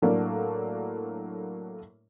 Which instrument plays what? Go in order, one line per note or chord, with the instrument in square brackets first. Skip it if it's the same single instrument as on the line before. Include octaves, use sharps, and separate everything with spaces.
[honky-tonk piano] A2 F#3 A3 A#3 D4